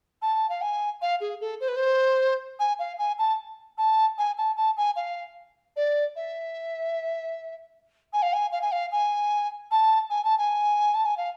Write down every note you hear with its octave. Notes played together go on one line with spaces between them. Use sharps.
A5
F5
G#5
F5
G#4
A4
C5
B4
C5
G#5
F5
G#5
A5
A5
G#5
A5
A5
G#5
F5
D5
E5
G#5
F5
G#5
F5
G#5
F5
G#5
A5
G#5
A5
G#5
A5
G#5
F5